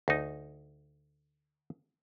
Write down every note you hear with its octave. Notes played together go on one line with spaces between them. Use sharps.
D2 D#4